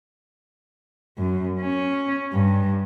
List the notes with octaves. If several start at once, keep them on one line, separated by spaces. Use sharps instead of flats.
F#2
C#4
G2